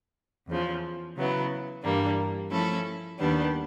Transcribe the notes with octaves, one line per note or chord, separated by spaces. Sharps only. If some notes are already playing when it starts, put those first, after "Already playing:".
E2 C#3 F3
C#3 F#3 B3 E4
G2 E3 G3 A#3 D4
F3 A3 C#4 E4 A4
D#2 D#3 G3 B3 D4